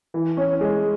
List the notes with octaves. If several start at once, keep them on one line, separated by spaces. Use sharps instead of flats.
E3
C#4
G#3